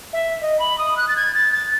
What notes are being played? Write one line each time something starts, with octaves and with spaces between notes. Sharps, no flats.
E5
D#5
B5
D#6
F#6
A6
G#6
A6
A6